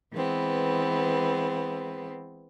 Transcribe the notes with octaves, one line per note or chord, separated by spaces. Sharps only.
E3 G#3 B3 C4